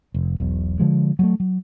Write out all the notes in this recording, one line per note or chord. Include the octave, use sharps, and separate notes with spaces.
F1
E1 B1
D3 F3 G#3
F#3 G3 A3
F#3